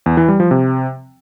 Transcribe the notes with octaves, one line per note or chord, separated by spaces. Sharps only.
E2
E3
G3
F3
C3